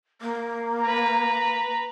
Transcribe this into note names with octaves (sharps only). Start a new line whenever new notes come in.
A#3
B4 A#5